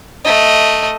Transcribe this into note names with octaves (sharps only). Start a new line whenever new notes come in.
A3 D#5